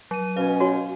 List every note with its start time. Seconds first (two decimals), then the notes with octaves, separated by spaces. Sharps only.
0.11 F#3 D#7
0.37 B2 C#4 B4 F5
0.60 F#4 C#5